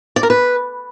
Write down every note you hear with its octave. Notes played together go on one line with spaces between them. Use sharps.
D5
A#4
B4